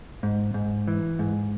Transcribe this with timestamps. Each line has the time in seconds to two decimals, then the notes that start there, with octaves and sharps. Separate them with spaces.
0.23 G#2
0.54 G#2
0.88 E3
1.19 G#2